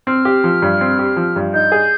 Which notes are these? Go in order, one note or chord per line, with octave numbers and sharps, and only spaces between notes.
C4 F6
G4
F3
G2
C4
G4
F3
G2
D#4 G6
G#4